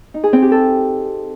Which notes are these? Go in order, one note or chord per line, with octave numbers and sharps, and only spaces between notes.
D#4
G#4
C4
G4
A4